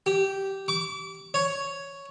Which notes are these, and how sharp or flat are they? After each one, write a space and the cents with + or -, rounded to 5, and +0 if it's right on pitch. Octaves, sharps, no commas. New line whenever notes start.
G4 -10
D6 -30
C#5 +5